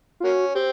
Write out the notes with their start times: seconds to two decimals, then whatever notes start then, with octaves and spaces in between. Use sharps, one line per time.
0.20 F4
0.24 A#3 C#4 F#4
0.55 C4 G4